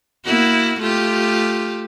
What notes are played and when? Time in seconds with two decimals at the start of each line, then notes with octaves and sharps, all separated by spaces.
0.24 A#3 E4 F#4
0.80 A3 F4 G4